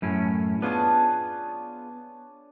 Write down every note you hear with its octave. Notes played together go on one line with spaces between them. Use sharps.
F#2 A2 C#4
B3 D4 F4 G#4 C#5 A5